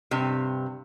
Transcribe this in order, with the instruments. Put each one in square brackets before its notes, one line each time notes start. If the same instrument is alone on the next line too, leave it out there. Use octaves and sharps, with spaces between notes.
[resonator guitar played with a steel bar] G2 C3